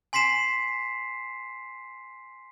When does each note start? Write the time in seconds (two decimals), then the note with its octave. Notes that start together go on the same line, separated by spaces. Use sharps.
0.13 G#5 C6 B6 C7 E7